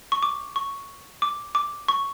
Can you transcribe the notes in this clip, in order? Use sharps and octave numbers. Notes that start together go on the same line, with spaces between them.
C#6
D6
C#6
D6
D6
C#6